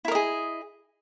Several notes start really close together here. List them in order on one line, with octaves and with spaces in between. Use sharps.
E4 A#4 D#5 G#4